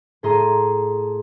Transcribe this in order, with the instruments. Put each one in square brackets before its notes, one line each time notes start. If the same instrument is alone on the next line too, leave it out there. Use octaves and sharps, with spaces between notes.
[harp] A2 A3 G#4 A#5 C6 D#7